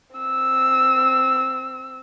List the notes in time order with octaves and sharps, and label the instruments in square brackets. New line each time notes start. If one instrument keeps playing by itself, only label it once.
[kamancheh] C4 E6